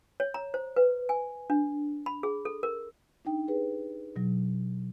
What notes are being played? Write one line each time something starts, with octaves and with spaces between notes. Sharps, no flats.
C#5
A#5
C5
B4
G#5
D4
B5
G#4
A4
A#4
D4 D#4 G5
G4 G#4 B4
B2 F#3